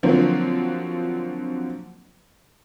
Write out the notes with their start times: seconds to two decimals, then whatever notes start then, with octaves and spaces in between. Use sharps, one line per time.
0.03 D3 F3 F#3 A#3 C4